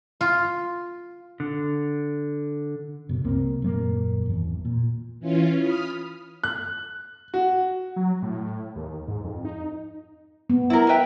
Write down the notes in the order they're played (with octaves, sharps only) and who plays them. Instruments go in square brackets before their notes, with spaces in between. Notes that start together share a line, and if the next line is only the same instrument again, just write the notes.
[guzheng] F4
[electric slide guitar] D3
[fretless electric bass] F#1 B2
C2 A#3 C4
D#1 F#2 G#3 A#3
G#1 E2
A#2
[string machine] E3 C#4 F4
B5 D#6 F6
[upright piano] F#6
F#4
[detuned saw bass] F#3
A2
D#2
G#2
F2
D#4
[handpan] B3
[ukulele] E4 A#4
B4 E5 G5